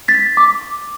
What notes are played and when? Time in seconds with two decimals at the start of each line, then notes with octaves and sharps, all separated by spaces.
0.08 A6 B6
0.37 D6